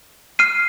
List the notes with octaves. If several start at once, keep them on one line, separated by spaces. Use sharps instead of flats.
F6 C7 D#7